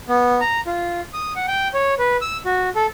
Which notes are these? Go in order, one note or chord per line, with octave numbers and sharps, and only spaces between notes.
B3
A#5
F4
D#6
F#5
G5
C#5
B4
E6
F#4
A4